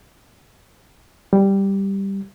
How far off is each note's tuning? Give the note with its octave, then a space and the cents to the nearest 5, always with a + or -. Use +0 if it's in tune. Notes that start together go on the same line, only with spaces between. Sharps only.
G3 +0